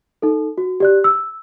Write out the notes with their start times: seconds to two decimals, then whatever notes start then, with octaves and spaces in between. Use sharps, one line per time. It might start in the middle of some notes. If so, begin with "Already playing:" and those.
0.22 D#4 A4
0.58 F#4
0.80 G4 D5 F#6
1.04 E6